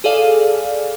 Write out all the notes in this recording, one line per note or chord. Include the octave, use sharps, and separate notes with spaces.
G#4 A4 D5 F5